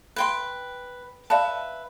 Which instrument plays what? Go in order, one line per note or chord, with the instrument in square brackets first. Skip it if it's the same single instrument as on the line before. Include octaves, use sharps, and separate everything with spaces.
[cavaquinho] B4 G5 C6
[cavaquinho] B4 E5 [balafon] D5 F5 A5